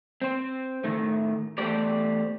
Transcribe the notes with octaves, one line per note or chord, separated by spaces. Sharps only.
C4 C5
A2 D#3 A3
E2 A3 G4 C5 D5